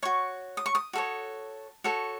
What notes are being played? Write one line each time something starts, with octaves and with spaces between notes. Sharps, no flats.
F#4 C#5 C#6
D#6
C#6
D#6
F#4 A4 C#5
F#4 A4 C#5